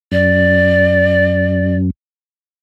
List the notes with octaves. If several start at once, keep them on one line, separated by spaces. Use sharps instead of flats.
F#2 D5